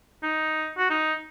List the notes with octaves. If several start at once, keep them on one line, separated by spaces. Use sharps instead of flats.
D#4
F#4
D#4